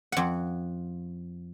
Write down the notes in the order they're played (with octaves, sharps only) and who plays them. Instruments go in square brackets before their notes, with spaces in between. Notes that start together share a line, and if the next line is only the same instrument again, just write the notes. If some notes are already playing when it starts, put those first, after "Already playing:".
[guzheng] F2 F#5